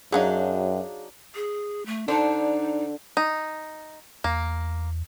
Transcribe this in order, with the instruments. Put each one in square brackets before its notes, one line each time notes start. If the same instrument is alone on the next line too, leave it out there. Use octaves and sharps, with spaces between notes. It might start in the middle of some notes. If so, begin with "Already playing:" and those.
[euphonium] F#2 [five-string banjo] F#3 D4 D#4 [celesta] G#4 F5
[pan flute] G#4
A3
[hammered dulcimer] D3 [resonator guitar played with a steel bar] D4 C5 [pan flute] D#4
[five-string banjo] D#4
[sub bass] E2 [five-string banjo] A#3